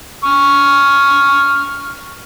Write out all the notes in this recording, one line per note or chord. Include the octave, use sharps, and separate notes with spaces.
C#6 F6